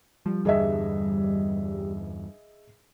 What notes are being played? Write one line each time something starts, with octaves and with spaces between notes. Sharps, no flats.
F3 G3
E2 G2 D3 G#4 D#5 E5